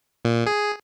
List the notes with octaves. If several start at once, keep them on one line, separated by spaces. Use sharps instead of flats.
A#2
G#4